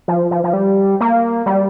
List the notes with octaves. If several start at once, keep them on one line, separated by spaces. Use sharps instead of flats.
F3
F3
F3
G3
A#3
G3